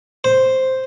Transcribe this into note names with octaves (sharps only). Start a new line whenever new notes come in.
C5